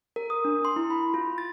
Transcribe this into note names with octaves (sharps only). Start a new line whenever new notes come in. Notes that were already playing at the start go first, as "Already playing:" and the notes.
A#4
D#6
D4
C6
E4
B5
F4
A6